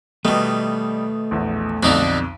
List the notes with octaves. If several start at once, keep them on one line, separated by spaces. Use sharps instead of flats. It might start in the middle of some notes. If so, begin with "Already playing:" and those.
B2 D#3 G3 A3
A#1 E2
B1 F2 D3 D#4 F#4